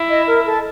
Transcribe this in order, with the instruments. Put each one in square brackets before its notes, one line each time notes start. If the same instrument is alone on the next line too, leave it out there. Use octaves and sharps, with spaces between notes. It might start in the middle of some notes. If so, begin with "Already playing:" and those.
Already playing: [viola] E4
[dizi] D#5
A#4
A4